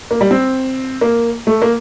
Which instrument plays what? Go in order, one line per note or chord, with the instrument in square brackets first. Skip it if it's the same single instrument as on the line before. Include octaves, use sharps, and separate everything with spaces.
[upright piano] A#3
G3
C4
A#3
A3
A#3